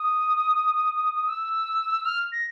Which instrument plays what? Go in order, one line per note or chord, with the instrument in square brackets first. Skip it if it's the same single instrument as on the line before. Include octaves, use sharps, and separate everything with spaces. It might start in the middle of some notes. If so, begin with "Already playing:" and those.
Already playing: [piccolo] D#6
E6
F6
A#6